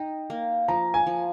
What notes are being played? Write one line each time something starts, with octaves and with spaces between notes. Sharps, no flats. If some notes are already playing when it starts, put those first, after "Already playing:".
Already playing: D#4 G5
A#3
F3 A#5
G#5
F3